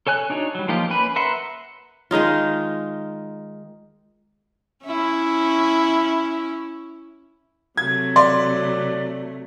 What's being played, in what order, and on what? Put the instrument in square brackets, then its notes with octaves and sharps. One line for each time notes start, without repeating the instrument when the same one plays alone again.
[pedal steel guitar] A4 C#5 G#5 F#6
D4 D#4 F#4 C#5
F#3 G3
F3 A#3 D#4 F4 G4
A#3 C#4 B4 B5
A#4 B4 E5 F#5 C6
[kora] D#3 G#3 D#4 F4
[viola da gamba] C#4 E4
[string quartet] C3 F#3 A3 [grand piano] G#6
[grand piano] D5 [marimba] C6